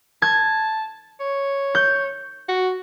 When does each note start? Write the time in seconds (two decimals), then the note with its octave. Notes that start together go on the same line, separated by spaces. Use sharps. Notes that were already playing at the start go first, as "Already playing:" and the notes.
0.22 A5 G#6
1.20 C#5
1.75 G6
2.48 F#4